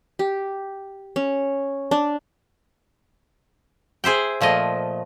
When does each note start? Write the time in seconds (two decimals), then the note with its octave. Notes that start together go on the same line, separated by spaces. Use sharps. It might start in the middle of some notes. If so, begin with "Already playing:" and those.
0.19 G4
1.16 C#4
1.91 D4
4.04 G#4 C5 E5 G5
4.41 A#2 F3 A3 D#5